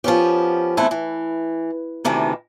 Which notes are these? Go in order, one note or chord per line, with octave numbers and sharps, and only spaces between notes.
F3 B3 C#4 G4
E2 A3 B3 C4 E4
E3
D2 C3 D#3 E3 A4